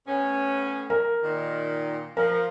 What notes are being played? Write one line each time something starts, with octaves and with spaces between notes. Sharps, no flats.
A2 B3 C#4
A#4
A#2 D#3
F3 A#4